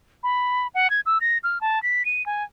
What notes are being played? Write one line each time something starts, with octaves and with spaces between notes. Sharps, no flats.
B5
F#5
G#6
E6
A#6
F6
A5
B6
D#7
G#5